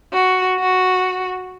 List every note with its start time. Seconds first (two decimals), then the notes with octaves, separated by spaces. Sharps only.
0.13 F#4
0.59 F#4